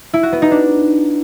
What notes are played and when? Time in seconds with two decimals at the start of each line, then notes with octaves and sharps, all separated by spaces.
0.14 E4
0.23 F#4
0.32 B3
0.42 D#4
0.51 D4